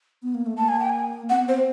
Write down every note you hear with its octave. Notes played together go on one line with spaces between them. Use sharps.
B3
A#3
A3
A#3 A5
G#5
G5
G#5
C4 F#5
B3
C4 C5